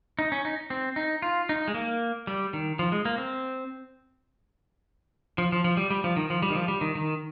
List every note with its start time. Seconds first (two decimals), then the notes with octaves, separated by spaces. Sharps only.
0.19 D#4
0.32 C#4
0.45 D#4
0.70 C4
0.96 D#4
1.22 F4
1.49 D#4
1.68 G#3
1.75 A#3
2.27 G3
2.53 D#3
2.79 F3
2.92 G#3
3.05 A#3
3.18 C4
5.38 F3
5.52 F3
5.64 F3
5.77 G3
5.90 G3
6.04 F3
6.16 D#3
6.30 F3
6.42 G3
6.50 D#3
6.56 F3
6.68 G3
6.81 D#3
6.95 D#3